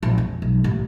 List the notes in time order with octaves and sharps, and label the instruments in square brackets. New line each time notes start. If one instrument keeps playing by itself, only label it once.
[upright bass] A#1
F2
B1
A1